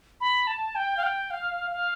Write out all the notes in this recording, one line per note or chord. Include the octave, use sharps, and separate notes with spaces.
B5
A5
G5
F5
G5
F5
F5